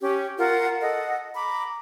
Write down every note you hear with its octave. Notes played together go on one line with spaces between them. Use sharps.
C#4 G4
F4 A#4 F#5
A4 D#5 F#5
A#5 B5 D6